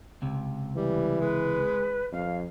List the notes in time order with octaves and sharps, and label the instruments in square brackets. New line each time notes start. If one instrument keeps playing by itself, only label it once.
[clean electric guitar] C#2 C3
[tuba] E3 [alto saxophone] G3
[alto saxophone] G#3 [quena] B4
[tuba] F2 [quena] F5